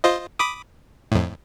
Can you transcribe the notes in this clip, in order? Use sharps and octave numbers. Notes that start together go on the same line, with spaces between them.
F4 C5 D#5
B5 D6 D#6
F2 A2